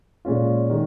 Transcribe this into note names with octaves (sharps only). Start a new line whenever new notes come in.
A#2 G#3 C#4 F4
D#3 G#3